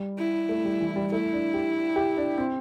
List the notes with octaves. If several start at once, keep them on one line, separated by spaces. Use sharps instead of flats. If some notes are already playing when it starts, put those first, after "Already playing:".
Already playing: G3
E4
A3
G3
E3
G3
A3 E4
D4
G4
G4
D4
C4